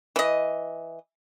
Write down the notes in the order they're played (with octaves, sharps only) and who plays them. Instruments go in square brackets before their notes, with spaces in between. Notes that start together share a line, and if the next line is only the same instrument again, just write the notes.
[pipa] E3 D#5